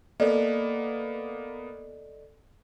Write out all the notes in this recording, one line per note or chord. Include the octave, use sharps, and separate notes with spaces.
A#3 B3 A4 D5 D#5